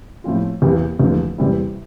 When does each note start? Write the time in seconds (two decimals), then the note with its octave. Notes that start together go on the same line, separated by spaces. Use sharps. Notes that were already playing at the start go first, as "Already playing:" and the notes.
0.24 A2 F3 C4 F4
0.62 E2 E3 A#3 E4 G4
0.99 E2 D3 F3 A3
1.38 E2 C3 G3 C4 E4